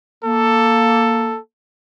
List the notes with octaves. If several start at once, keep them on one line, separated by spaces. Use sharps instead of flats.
A#3 A4